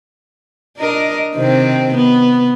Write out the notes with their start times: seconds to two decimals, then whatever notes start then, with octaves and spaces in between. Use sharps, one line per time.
0.78 D4 A#4 D#5
1.35 C3 D#3 C4
1.95 B3